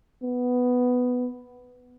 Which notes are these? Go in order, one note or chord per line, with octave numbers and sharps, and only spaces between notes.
B3